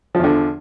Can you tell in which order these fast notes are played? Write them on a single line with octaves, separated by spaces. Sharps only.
F3 E2 D3